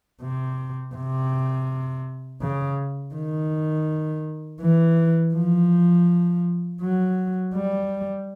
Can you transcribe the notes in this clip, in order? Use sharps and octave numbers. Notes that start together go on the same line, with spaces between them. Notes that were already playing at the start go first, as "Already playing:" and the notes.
C3
C3
C#3
D#3
E3
F3
F#3
G3